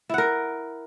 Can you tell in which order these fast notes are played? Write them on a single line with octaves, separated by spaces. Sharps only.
E4 F#5 A#4